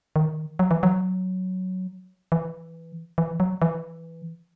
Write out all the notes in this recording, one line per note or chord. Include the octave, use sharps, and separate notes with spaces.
D#3
F#3
E3
F#3
E3
E3
F#3
E3